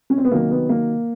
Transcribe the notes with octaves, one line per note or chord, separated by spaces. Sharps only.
C#4
C4
B3
C3 D#3 F#3 A#3
B3
A#3